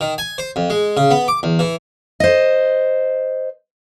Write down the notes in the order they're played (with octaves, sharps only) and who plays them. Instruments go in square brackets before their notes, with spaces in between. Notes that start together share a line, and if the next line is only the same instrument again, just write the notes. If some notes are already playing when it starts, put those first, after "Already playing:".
[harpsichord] D#3
G#5
C5
F2
G#3
C#3
B3
D6
E2
E3
[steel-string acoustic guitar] C5 D#5